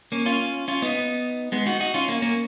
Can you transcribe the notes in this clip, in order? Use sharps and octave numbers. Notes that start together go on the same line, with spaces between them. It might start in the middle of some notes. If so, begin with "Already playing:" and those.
A#3 C#4
C#4 F4
C#4 F4
B3 D#4
G#3 B3
D#4 F#4
D#4 F#4
C#4 F4
A#3 C#4
A#3 C#4